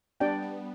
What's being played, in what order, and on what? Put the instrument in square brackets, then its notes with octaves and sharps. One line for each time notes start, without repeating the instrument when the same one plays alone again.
[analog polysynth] G3 B3 [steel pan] D4 G4 D5 G5
[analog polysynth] G3 B3